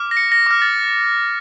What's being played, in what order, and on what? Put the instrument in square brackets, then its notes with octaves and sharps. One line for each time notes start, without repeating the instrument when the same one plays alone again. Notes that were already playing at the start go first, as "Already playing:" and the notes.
Already playing: [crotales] D6 F6
A#6
C#7
A#6
D6 F6 A#6
A6